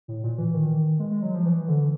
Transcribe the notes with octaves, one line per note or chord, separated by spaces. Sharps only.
A2
A#2
E3
D#3
G#3
G#3
F#3
F3
E3
D3